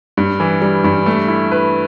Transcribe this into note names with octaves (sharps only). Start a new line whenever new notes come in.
G2
E3
G3
G2
A3
E4
B4